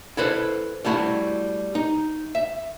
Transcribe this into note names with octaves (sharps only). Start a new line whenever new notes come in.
E4 A4 B4 C5
G3 A3 E4 F#4
D#4
E5